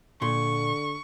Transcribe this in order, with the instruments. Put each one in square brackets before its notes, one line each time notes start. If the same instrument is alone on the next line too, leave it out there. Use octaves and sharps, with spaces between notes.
[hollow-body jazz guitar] A#2 C6 [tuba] D3 [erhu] C#6